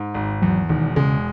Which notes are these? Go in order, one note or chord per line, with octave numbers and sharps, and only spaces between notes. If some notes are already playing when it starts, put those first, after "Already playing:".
Already playing: G#2
G#1
E2 F#3
E1 D#3
C#3 G#3